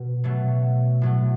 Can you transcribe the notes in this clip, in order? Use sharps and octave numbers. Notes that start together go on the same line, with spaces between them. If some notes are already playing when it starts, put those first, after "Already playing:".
Already playing: B2
B2 F#3 A3
A2 F#3 A3